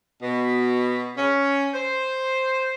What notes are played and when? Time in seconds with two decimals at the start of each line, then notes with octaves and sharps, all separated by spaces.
0.22 B2
1.16 C#4
1.74 C5